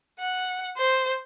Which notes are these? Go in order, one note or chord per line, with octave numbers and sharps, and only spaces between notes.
F#5
C5